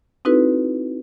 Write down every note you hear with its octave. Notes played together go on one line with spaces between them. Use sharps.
C4 D#4 E4 F#4 A4 B4